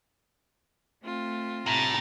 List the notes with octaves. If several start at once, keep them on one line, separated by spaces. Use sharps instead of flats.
A3 C4 F4
A2 C3 A#5 A6